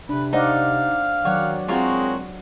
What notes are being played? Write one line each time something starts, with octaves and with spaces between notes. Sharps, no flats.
C3 D4 B4
D#4 C5 D5 F5 F#5
D#3 F#3 C#5 D5 F#5
G#3 C4 F4 F#4 A#4 C#5